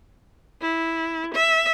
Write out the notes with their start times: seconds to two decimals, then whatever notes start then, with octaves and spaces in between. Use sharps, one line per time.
0.61 E4
1.34 E5